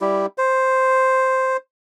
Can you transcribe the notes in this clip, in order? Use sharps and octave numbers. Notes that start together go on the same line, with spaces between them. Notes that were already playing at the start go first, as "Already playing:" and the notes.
G3 E4 G4
C5